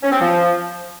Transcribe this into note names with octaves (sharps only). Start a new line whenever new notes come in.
C#4
C4
F3